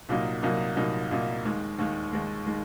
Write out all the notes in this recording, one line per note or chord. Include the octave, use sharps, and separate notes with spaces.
C2 A#2 F#3 A#3 D#4
C2 A#2 F#3 A#3 D#4
C2 A#2 F#3 A#3 D#4
C2 A#2 F#3 A#3 D#4
D#2 D#3 G#3
D#2 D#3 G#3
D#2 D#3 G#3
D#3 G#3